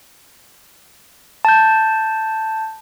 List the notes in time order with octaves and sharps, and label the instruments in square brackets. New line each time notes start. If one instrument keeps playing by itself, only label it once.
[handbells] A5 G6